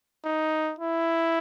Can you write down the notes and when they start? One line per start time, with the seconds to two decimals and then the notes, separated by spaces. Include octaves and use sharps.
0.25 D#4
0.79 E4